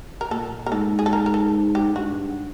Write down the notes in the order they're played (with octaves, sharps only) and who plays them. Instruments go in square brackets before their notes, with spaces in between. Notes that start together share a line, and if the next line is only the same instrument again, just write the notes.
[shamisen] A#4
[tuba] A#2 [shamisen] A4
[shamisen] A#4
[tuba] G#2 [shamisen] A4
[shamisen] G#4
A4
A#4
A#4
A4
G4
[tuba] G2 [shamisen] F#4